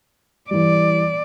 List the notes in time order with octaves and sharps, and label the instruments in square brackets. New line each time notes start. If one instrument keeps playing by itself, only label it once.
[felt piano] E3 G3 [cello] D5